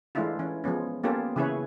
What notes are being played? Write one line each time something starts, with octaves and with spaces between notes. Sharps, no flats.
E3 G#3 A3 D4 E4 F4
E3 C#4
F3 G#3 B3 C#4
A#3 B3 C#4 F4 G4 A4
C#3 E3 E4 G#4 B4 C#5